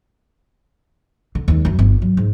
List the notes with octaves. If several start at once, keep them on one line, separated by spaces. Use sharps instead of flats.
D3
D#2 G#3
F#2 F#3
G1
F#3
G#2